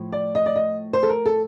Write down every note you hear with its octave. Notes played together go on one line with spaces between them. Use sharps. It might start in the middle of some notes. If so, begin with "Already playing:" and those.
Already playing: A2 F3
D5
D#5
D5
D#5
C5
A4
A#4
A4